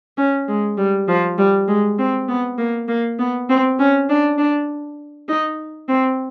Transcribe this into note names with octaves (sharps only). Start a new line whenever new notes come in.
C#4
G#3
G3
F3
G3
G#3
C4
B3
A#3
A#3
B3
C4
C#4
D4
D4
D#4
C4